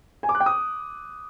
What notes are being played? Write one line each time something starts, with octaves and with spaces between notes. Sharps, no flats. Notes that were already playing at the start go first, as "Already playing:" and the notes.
G#5
D6
F#6
G5
D#6